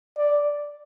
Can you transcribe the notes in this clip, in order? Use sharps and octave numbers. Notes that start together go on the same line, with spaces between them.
D5